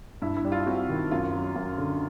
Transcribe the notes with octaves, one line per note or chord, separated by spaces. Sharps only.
G2 E4
E4
G3
F4
C4 F#4
D#3
F#2 F4
F#3
F#2
D3